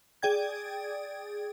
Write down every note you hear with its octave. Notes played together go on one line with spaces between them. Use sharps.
G#4 D5 G5 G#6